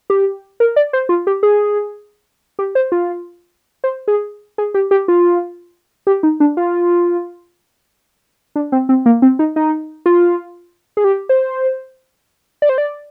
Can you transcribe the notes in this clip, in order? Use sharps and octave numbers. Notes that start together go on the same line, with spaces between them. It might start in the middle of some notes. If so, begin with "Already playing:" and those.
G4
A#4
D5
C5
F4
G4
G#4
G4
C5
F4
C5
G#4
G#4
G4
G4
F4
G4
D#4
D4
F4
D4
C4
C4
A#3
C4
D#4
D#4
F4
G#4
G4
C5
D5
C5
D5